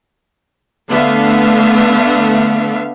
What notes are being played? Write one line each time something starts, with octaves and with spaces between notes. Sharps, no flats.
D3 A3 B3 E5 F5